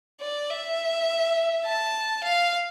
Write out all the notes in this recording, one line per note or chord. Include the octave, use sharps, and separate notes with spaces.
D5
E5
A5
F5